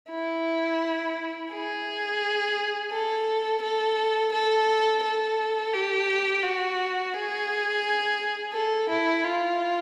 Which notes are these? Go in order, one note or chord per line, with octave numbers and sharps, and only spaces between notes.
E4
G#4
A4
A4
A4
A4
G4
F#4
G#4
A4
E4
F4